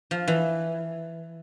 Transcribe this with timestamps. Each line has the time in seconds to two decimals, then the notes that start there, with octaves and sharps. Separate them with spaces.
0.11 F3
0.28 E3